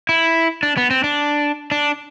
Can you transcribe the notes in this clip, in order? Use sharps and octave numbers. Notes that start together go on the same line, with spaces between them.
E4
D4
B3
C4
D4
D4